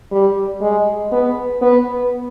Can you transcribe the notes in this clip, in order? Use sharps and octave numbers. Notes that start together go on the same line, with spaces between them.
G3
G#3
B3
B3